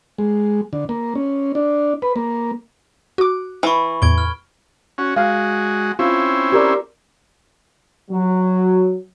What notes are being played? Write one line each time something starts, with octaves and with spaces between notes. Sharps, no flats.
G#3
D3
A#3
C#4
D4
B4
A#3
F#4 D6
E3 B5 C#6
E2 A2 G#6 D7 G7
F6
C#4 F#4
G#3 F#4 F5
C4 C#4 E4 F4
G4 A#4 D5
F#3